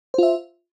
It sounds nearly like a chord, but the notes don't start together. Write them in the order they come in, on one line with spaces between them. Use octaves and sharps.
C5 F4 E5